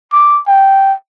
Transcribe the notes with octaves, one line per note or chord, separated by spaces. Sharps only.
D6
G5